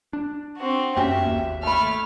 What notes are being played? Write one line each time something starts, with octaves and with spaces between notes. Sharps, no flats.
D4
C4 F#4
F#2 A#3 C#4 F#4 G4 E5
G#1 D#2 A#3
A3 A5 B5 F6